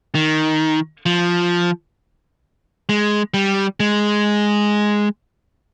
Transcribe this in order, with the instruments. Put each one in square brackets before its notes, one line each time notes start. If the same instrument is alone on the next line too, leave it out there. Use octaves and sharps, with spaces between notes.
[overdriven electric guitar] D#3
F3
G#3
G3
G#3